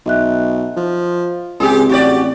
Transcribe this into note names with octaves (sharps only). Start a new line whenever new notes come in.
B1 D#5 E5 F#6
F3
C#2 C4 G4 G#4
A1 F#4 G4 D5